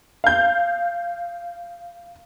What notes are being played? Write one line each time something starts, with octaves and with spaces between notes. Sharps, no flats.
F5 G6